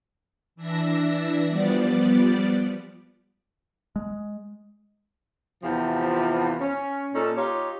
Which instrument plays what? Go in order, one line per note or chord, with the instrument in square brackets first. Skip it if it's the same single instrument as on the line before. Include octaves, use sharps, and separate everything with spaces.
[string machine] E3 D4 E5 A#6
F3 G3 B3 D5
[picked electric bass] G#3
[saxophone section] E2 C3 F3
C#4
A#2 C#4 D#4 A4
D#4 F4 G4 C#5